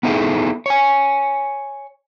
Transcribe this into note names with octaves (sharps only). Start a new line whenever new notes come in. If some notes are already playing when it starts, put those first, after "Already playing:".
B3 D#4 E4 G#4 A4
C#5 G#5